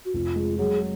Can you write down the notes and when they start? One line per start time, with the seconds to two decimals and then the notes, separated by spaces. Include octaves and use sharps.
0.05 F#4
0.14 F1 F4
0.36 G#3
0.59 F#3 G#4